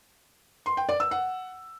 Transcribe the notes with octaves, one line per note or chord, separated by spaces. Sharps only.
C6
G5
D5
E6
F#5